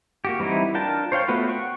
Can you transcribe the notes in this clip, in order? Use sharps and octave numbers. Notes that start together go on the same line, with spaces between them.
A#3 F#4 G4
E3 G3 C4 D#4 E4
D4 F4 A#4 G5 A5
C5 C#5 F5 G5
A3 B3 F4 F#4 B4
F#5 G5 C#6